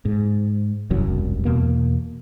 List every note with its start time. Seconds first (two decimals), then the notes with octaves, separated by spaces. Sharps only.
0.05 G#2
0.91 E1 C2 F#2 F#3
1.45 E2 B2 A#3